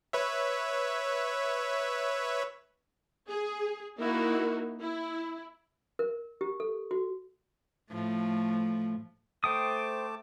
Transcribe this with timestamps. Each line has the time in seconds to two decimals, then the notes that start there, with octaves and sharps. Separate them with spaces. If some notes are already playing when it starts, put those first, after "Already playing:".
0.13 B4 C#5 E5
3.29 G#4
4.00 A#3 D#4 E4 F#4 A#4
4.80 E4
5.99 A#4
6.41 G4
6.60 A4
6.91 F#4
7.91 A2 F3 A3
9.44 A3 C5 G5 A5 D6 D#6